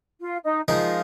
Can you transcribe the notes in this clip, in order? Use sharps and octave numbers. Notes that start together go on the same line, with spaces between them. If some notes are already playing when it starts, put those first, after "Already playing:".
F4
D#4
F3 G#3 D#4 F4 A#4